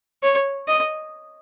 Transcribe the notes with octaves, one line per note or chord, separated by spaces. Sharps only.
C#5
D#5